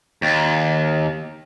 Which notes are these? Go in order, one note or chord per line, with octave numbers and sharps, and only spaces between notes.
D#2